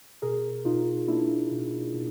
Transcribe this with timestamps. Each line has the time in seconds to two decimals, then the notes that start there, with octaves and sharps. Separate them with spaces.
0.22 B2 G#4 A#4
0.65 B2 D#4 F4
1.08 A#3 D4 E4
1.51 B2
1.94 B2